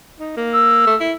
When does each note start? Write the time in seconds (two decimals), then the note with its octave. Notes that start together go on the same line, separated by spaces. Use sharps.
0.20 D#4
0.37 A#3
0.54 E6
0.87 A3
1.00 E4